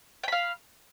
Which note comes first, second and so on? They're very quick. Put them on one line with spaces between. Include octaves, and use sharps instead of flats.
G5 B5 F5